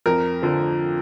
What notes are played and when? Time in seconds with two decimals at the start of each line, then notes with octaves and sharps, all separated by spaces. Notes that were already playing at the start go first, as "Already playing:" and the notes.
0.06 F2 A#4
0.42 D3 F3